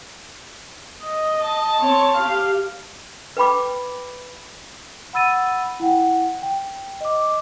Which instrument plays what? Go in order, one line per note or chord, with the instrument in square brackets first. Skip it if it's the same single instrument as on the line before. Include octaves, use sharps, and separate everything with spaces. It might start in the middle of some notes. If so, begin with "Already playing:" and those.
[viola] D#5
[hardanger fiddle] A5
[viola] C4 C#5
G4 F5
[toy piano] B4 G5 B5 D6
[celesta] F#5 B5 E6 A6 D#7
E4 F#5 G5
G5
D#5 D6